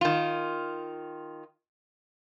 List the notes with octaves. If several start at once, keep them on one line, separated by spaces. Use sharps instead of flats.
D#3 F4